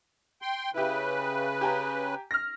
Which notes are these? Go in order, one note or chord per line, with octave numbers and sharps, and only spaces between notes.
G5 C6
C#3 E4 G4 B4
G4 G#5 A#5
F6 A#6